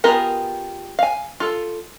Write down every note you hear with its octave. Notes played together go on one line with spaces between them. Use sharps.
B3 F4 G4 G#4 A#4
F5 G#5
F4 A4